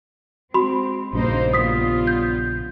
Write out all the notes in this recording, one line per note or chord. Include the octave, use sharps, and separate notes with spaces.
G#3 C4 F#4 B5 C6
A#1 G2 C#3 A#3 D#4 C5
G3 B3 F4 D#6 B6
G6